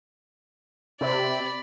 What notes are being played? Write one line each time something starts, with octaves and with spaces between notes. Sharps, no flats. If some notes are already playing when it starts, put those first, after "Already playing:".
C3 D5 B5